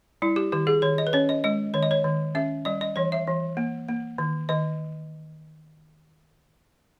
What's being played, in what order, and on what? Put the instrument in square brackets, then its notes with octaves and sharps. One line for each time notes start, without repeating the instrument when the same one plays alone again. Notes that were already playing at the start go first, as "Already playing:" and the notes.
[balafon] G3 E4
G4
D#3 G4
G#4
D#3 C#5
D#5
B4
C#4 C#5
D#5
G#3 D#5
D#3 C#5
D#5
C#5
D#3
C#4 E5
G3 D#5
D#5
E3 C#5
E5
E3
A#3
A#3
D#3
D#3 D#5